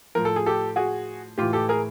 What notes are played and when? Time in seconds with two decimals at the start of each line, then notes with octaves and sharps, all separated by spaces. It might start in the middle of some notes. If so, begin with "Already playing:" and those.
0.15 A2 F3 A#4
0.25 A4
0.36 G#4
0.46 G4 A4
0.76 F#4 G#4
1.38 A2 E3 F4 G4
1.53 G4 A4
1.69 G#4 A#4